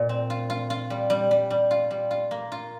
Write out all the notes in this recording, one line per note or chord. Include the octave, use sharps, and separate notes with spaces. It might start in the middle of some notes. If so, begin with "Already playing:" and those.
Already playing: A#2
C4
F4
F4
F4
G3
G3
G3
G3
F4
G3
F4
A#3
F4